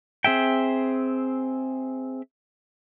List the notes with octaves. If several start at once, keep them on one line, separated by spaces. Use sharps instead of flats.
C4 G#4 E5 G5